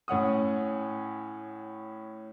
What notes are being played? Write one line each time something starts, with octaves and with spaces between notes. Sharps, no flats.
A2 C#4 F#5 D#6